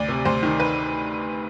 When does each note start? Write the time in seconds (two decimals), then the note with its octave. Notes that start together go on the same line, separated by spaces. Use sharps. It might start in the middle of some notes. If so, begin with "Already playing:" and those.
Already playing: D2 D5
0.08 C3
0.25 D2 C5
0.43 D#3
0.60 B4